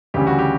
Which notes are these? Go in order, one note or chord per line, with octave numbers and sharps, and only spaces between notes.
D2 C#3 E3 G3 G4
F#4
G4